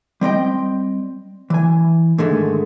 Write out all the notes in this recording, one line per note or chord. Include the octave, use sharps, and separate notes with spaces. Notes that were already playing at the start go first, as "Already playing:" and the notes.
G3 C4 D#5 G5
E3 G#5
G#2 D3 D#3 G#3 A3